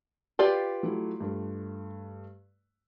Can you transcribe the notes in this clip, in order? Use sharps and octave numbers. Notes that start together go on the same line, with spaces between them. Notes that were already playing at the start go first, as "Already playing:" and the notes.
F4 G4 B4 D5
F#3 A3 E4
G2 A3